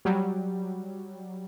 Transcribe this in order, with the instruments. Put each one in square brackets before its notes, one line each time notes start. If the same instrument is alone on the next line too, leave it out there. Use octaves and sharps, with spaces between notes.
[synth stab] F#3 G3